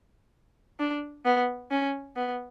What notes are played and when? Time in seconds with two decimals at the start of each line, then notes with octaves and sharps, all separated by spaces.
0.80 D4
1.25 B3
1.71 C#4
2.16 B3